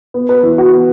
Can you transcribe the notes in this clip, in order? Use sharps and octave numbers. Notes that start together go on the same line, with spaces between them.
B3
B4
E3
F#4
B3